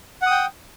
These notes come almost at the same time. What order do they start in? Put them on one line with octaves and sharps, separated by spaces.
F#5 D#6 G5